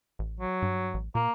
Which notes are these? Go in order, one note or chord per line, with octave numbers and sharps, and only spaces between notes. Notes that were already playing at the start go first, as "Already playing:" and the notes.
A1
F#3
G2
A1
A#2 A#3